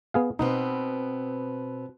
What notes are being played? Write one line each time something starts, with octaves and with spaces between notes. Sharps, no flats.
B3 G#4 F5
B2 B3 C4 D#4